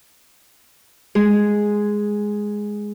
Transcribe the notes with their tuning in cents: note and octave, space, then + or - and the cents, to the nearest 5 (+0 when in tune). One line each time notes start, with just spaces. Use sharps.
G#3 +0 G#4 +0